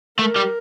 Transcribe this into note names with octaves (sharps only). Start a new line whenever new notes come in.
A3 A#4
G3